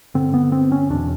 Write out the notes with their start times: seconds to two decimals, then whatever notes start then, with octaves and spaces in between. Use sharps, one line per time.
0.14 G2 D3 C4
0.34 B3
0.52 C4
0.72 C#4
0.90 E2 B2 D4